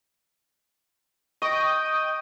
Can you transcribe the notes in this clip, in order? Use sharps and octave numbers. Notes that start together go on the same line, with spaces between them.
D#5 G5 C#6 D#6